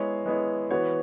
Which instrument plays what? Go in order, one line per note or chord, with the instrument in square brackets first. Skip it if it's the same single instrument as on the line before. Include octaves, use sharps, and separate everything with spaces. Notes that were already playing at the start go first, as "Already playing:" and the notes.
Already playing: [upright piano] G#3 B3 E4 C#5
G#3 B3 E4 C#5
E3 B3 F#4 C#5